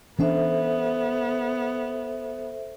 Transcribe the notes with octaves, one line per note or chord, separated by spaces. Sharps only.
E3 B3 C#4 D4 A4 C5 E5